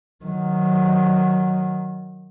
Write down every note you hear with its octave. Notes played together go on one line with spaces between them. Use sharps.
D#3 F#3